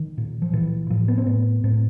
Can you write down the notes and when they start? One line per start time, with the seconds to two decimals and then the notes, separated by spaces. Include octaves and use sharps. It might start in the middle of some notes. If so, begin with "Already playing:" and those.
Already playing: D#3
0.17 A#2
0.42 F3
0.53 A#2 E3
0.90 A2 F3
1.08 B3
1.18 C4
1.26 A2 B3
1.64 A2 C4